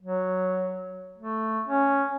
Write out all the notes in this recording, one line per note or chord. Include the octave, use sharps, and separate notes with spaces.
F#3
A3
C#4